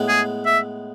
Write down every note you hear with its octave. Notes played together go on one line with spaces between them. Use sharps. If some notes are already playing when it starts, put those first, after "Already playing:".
Already playing: A2 G#3 B3
G#4
E5